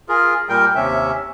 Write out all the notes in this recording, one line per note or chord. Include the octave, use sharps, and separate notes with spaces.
F4 G#4 A#4
A#2 G3 A#4 G5
D#2 C3 C#4 E5